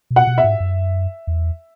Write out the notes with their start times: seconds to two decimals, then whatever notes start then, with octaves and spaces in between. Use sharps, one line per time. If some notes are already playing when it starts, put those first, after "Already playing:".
0.11 B2
0.16 F#5
0.27 B2
0.38 E5
0.44 G#2
0.60 F#2
1.27 E2